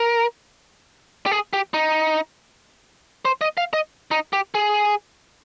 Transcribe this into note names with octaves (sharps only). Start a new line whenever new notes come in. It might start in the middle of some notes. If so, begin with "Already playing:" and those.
Already playing: A#4
G4
G#4
G4
D#4
C5
D#5
F5
D#5
D#4
G4
G#4